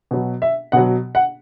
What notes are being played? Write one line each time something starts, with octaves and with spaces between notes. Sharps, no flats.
B2 F#3
E5
B2 F#3 F#5
F#5